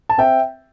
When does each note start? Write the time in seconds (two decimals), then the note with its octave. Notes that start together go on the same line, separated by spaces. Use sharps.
0.09 A5
0.18 C4 E5 G5